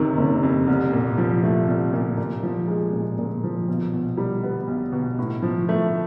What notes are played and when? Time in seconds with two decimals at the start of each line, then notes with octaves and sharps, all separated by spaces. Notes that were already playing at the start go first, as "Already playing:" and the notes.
Already playing: F#1 F2 C3 D#3
0.17 F#1
0.43 F2
0.67 C2
0.93 A#2
1.18 F3
1.43 A3
1.68 C2
1.93 A#2
2.17 A#2
2.43 F3
2.68 G#3
2.93 A#2
3.18 A#2
3.44 F3
3.68 B1
3.93 B2
4.18 G3
4.43 B3
4.68 B1
4.92 B2
5.19 A2
5.42 F3
5.69 A3